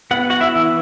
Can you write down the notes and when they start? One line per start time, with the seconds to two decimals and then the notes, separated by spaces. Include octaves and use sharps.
0.11 B3 F#5
0.30 F#4 F#5
0.40 E4 E5
0.56 E3